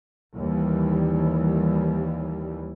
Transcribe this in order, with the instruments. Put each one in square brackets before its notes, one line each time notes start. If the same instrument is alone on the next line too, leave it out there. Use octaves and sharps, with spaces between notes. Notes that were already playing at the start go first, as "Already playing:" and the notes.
[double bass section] D#2 E3 G3